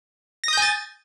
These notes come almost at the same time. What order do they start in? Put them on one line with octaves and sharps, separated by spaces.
A#6 D#6 G6 G#5 A6